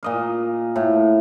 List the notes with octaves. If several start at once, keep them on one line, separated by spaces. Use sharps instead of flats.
A#2 D#5 F5
A2